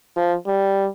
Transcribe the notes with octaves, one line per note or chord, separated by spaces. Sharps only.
F3
G3